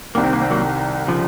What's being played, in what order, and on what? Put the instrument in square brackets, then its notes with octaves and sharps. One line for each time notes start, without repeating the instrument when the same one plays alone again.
[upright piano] C2 C3 D#3 [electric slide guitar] A#3
[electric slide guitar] C4
A#3
C4
F#3 A#3
C#3 F3